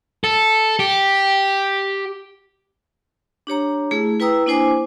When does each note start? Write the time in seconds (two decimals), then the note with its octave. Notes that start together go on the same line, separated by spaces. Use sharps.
0.24 A4
0.79 G4
3.47 D4 G4 C#5 A#5
3.91 A3 E4 G#4
4.20 E4 B4 G5 A#5 D#6 E6
4.46 A#3 D4 E4 C5 G#5 D6